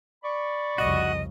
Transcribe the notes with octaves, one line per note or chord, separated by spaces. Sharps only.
D5 B5 C#6
C2 F2 C#3 F#4 D#5